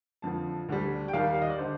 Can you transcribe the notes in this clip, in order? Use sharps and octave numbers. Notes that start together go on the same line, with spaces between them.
F2 D3 F3 A5
D2 D3 G3
G5
D#2 D#3 G3 F5
F5
D#5
D5
D3 C5